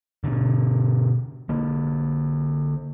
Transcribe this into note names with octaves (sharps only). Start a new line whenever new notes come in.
B2 D3
D3 A#3